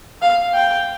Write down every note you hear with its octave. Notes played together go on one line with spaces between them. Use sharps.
F5
G5